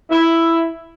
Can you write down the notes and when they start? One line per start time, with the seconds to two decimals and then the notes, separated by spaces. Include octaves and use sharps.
0.11 E4